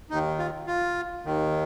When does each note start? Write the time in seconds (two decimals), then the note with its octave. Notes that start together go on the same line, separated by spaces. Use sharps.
0.10 D#2 D#3 D#4
0.39 F4
0.67 F4
1.25 D#2 D#3